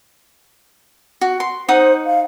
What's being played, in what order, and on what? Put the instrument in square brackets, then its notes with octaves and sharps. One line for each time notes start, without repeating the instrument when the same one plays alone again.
[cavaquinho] F#4
C6
[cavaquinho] D#4 F#5 D#6 [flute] C5
[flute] F5